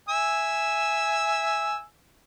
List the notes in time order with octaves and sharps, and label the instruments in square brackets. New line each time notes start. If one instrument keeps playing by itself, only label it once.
[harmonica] E5 G#5 E6